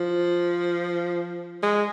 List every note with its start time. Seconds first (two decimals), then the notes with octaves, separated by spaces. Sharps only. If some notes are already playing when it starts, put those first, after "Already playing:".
Already playing: F3
1.63 G#3